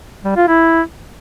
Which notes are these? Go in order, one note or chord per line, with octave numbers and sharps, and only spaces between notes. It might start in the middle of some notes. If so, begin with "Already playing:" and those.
G3
F4
E4